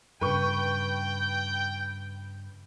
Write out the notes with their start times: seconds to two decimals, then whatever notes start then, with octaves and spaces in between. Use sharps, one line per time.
0.21 G2 C#3 B4 G5 C#6